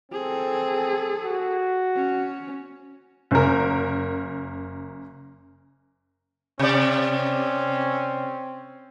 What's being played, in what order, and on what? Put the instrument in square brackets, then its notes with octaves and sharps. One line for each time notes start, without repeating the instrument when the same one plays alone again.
[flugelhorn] C4 [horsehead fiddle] G#4 A4
[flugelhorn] F#4
[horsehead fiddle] C#4
[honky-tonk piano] F#1 A#4
[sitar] C3 D5 [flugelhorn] C4 [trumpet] C#4